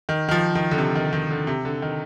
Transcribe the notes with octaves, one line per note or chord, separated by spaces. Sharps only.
D#3
D#3
F3
D#3
D3
C3
D#3
D#3
D3
C3
D3
D#3